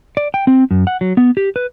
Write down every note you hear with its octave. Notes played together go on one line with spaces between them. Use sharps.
D5
G5
C4
F#2
F#5
F#3
B3
G4
B4